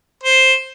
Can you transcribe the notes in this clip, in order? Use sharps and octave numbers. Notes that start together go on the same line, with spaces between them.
C5